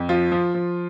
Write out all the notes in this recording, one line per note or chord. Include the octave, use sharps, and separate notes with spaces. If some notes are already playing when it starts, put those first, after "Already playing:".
Already playing: F2
F3 F4
F3
F3